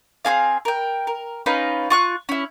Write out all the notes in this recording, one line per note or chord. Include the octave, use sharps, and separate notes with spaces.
C4 D#4 G#4 F5
A#4 G5
A#4
C#4 D#4 F4 B4
F4 C#6 F#6
C#4 E4